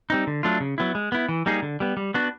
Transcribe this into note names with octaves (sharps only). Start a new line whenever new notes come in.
G3 C4 D#4
D3
F#3 A3 D4 F4
C#3
F#3 B3 E4
G#3
B3 E4
E3
G3 A#3 D#4 G#4
D3
G3 B3
G3
B3 D4 F#4